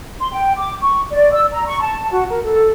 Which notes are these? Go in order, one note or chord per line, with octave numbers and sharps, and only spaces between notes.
C6
G5
D6
C#6
D5
E6
A#5
C#6
A5
F#4
A#4
A4